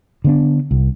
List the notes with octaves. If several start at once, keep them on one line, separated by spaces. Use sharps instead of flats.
D3 B3 D4
C2